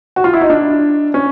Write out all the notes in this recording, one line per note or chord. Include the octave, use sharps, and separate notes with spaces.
F#4
F4
E4
D#4
D4
C#4